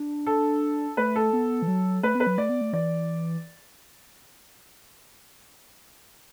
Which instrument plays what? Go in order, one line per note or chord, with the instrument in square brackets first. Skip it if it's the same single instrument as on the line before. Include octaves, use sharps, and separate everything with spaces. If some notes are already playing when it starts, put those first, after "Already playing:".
Already playing: [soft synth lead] D4
[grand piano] A4
[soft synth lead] A3 [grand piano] B4
[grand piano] A4
[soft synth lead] B3
E3
F#3
[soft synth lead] A3 [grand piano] B4
[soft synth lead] B3
[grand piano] B4
[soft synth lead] F#3
[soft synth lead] A3 [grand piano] D5
[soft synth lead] B3
A3
[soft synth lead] E3 [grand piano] D5